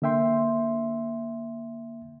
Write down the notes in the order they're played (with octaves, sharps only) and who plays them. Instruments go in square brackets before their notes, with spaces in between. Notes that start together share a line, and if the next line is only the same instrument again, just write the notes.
[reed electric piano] D3 A#3 E5 G5 C6